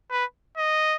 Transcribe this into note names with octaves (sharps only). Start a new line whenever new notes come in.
B4
D#5